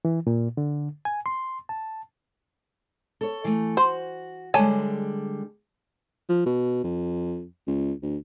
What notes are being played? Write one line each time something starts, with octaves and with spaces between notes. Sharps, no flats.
E3
A#2
D3
G#5
C6
A5
A4 C#5
E3 A3
F#4 C5
D3 G3 G#3 C#5 G#5 A5
F3
B2
F2
C#2
D2